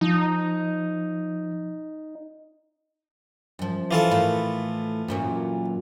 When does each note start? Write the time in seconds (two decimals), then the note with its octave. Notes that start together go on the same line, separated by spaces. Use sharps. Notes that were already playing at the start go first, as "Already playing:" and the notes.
0.01 F3 D#4
3.59 F#2 F3
3.91 E3 F4 A4
4.11 A2 A#4 F5
5.08 F#2 A#2 F#3